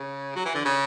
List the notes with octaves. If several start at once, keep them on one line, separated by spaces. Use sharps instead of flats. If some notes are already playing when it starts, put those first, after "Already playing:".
Already playing: C#3
F#3
E3
D3
C#3